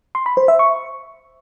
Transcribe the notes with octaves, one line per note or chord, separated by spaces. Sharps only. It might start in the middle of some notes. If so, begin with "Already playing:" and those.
C6
B5
C5
E5
C#6